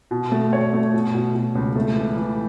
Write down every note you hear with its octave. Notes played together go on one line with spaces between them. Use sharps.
B2
A3
C#5
A3
B2
B2
B2
C#2
A3
E3
E3